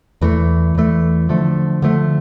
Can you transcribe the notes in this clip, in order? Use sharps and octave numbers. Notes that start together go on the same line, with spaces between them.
E2 E3 A3
E2 E3 A3
D3 F3 A3
D3 F3 A3